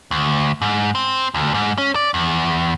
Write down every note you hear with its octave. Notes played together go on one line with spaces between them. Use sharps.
D2
G#2
C4
D2
G#2
C#4
D5
E2